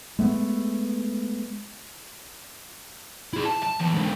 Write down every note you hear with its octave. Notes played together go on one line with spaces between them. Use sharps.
G#3 A3 B3
E4 G#4
A5
A5
E2
G#2 D3